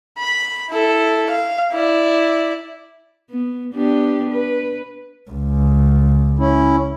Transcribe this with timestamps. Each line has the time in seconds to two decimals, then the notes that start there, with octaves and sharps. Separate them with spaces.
0.18 B5
0.70 E4 A4
1.30 F5
1.73 E4 D5
3.30 B3
3.73 B3 D4 G4
4.30 B4
5.31 C#2
6.39 C#4 E4